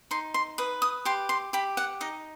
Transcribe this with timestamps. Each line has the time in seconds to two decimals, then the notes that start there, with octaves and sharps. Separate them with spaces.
0.11 D#4 C6
0.34 C6
0.58 B4 D#6
0.82 D#6
1.05 G4 C6
1.29 C6
1.53 G4 B5
1.77 F#5
2.01 D#4 D#5